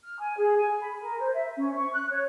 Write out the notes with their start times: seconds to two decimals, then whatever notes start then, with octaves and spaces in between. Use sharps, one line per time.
0.03 F6
0.19 G#5
0.37 G#4
0.56 G#5
0.81 B5
1.01 A#4
1.20 C5
1.33 E5
1.55 C#4
1.75 C#6
1.92 F#6
2.09 C#5